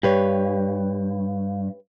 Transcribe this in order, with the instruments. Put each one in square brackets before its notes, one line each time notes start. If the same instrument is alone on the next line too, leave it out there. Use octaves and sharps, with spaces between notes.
[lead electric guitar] G2 [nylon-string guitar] G4 B4 C#5